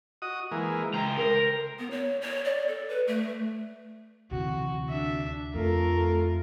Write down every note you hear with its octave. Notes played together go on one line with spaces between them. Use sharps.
F#4 D#5 D#6
E3 G#3 A#3
C#2 C5 G5 A#5
A#4
B3
C#5
C#5
D5
A4
B4
A3
D2 C3 E3 F#4
D4 E5
F2 A3 F4 A#4